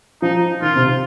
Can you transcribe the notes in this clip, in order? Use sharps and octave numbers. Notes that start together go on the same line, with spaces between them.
F3 D#4
D#3 F4
C3